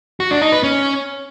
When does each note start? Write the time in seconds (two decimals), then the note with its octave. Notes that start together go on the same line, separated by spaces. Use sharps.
0.20 F#4
0.31 D4
0.42 D#4
0.52 B4
0.63 C#4